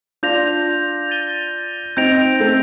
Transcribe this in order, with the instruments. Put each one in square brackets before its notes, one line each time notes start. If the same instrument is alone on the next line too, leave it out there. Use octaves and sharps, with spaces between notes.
[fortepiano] D4 F4 [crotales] G6 A#6 F7
[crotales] A6 D#7 G7
[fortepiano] C4 D#4 [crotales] G6 A#6 D7 F7
[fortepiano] A3 C4